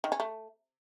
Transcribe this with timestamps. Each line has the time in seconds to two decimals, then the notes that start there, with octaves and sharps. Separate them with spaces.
0.04 D#3
0.12 C#4
0.20 A3